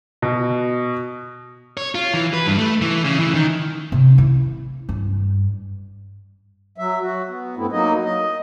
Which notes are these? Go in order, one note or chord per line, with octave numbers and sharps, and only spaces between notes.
B2
C#5
F4
E3
B4
G2
A3
E3
C#3
E3
D#3
C3
E4
G2
F#3 E5
F#4
B3
G2 A3 B3 C4 E4
F#3 A#3 D#4 D#5
D#5